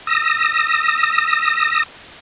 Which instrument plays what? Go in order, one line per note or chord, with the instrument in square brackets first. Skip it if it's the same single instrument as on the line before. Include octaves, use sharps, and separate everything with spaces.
[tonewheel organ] D#6 E6 A#6